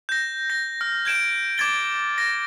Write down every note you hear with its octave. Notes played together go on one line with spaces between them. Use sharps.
G6 A#6
A#6
F6
G6 G#6 D7 E7
D6 G#6 A6 G7
A#6